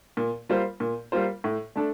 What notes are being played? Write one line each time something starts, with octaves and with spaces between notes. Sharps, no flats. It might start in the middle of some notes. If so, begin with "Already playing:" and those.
A#2
G3 A#3 F4 C5
A#2
G3 A#3 F4 C5
A2
A3 D4 A4